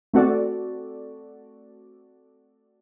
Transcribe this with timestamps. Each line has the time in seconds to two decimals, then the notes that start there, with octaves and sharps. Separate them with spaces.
0.13 A3 C4 F#4 A4 D5